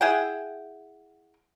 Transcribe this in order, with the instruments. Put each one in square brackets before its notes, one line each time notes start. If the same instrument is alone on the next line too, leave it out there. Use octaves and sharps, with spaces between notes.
[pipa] E4 G#4 F#5 G5